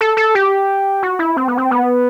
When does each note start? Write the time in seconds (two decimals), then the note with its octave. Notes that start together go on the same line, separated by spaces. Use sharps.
0.01 A4
0.17 A4
0.35 G4
1.03 F#4
1.19 E4
1.37 C4
1.48 B3
1.58 C4
1.71 B3